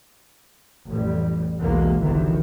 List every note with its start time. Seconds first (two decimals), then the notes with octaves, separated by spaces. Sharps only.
0.90 A1 F2 G3
1.59 B1 E2 E3 G#3 A#3
2.02 G1 C2 F#2 D#3 E3